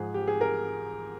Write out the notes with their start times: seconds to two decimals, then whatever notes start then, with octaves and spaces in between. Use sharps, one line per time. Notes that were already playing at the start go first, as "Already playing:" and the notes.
Already playing: G#2 F3 G#4
0.14 G4
0.27 G#4
0.41 A#4